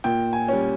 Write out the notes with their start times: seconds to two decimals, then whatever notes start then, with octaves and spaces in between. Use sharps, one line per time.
0.04 A#2 G5
0.33 G#5
0.48 G3 C#4